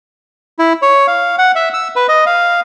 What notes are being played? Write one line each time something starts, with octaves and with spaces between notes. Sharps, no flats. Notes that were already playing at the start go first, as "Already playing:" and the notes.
E4
C#5
F5
F#5
E5
E6
B4
D#5
F5